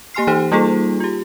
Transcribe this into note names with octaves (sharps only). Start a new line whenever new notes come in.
A#3 G4 G#5 C6 F6 C7
E3 D#4 G4 C5
G3 A#3 D#4 F4 G#4 A4
F4 G4